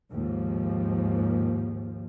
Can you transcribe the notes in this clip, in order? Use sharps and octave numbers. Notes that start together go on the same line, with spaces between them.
D#2 G#2 F3